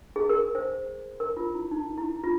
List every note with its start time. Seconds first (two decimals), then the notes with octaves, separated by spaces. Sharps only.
0.16 G#4
0.29 A#4
0.55 C5
1.20 A#4
1.37 F4
1.55 E4
1.71 D#4
1.98 E4
2.24 F4